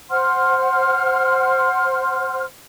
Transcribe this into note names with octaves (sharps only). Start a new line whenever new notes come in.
C5 F#5 C6 F6